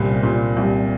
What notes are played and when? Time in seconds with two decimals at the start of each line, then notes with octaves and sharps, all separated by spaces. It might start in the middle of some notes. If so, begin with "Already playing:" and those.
Already playing: C2 A#2 C4
0.23 A#2
0.57 C2